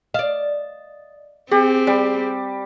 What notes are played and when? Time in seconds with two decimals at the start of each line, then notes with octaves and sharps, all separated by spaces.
0.14 D5 D#5 F5
1.51 C4 G4 G#4
1.87 G3